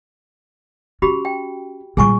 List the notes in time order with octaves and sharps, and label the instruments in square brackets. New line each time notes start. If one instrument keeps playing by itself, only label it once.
[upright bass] C#4 [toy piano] F#4 G4 B5
[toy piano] G5
[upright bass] A#2 G3 [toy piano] G#4 G#5 C#6